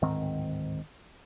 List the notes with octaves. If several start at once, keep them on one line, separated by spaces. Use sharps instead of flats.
D1 G#2 D#3 C4